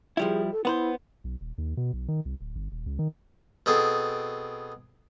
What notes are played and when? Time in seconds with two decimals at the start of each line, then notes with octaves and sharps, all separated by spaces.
0.17 F3 G3 E4 G#4
0.52 A4
0.65 B3 E4 B4 C5
1.24 B1
1.41 D#1
1.58 D#2
1.77 B2
1.93 B1
2.08 D#3
2.25 C2
2.41 D1
2.56 G1
2.72 D#1
2.86 C#2
2.99 D#3
3.66 B2 C4 G#4 A4